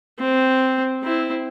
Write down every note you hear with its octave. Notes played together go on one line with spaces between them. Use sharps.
C4
C4 E4